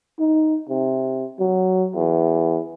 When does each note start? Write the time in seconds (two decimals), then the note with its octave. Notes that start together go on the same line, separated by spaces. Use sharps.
0.20 D#4
0.69 C3
1.40 F#3
1.95 E2